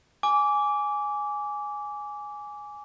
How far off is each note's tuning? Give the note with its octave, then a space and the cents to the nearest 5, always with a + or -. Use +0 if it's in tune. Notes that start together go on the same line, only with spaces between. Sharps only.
G#5 +0 D6 -20